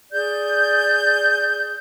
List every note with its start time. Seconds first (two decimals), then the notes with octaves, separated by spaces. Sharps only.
0.12 G#4 D5 G6